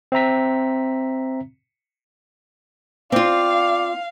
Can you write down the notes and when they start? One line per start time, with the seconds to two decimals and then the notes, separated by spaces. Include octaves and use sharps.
0.12 C4 E5 A#5 B6
3.12 C4 F4 D5 F5